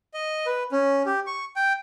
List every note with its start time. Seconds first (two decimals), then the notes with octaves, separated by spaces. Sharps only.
0.14 D#5
0.46 B4
0.72 C#4
1.06 G4
1.27 C#6
1.56 G5